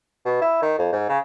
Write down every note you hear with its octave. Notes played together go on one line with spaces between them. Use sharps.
B2
E4
D#3
F2
G#2
C#3